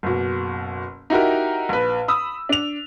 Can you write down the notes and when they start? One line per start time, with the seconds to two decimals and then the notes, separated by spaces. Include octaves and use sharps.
0.03 F#1 B2
1.10 D#4 E4 F#4 G4 A#4
1.69 A#1 B4
2.08 B5 D#6 E6
2.49 D4 F7